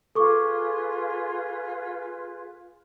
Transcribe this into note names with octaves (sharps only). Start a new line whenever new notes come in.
F4 G#4 A4 B4 C#6 D6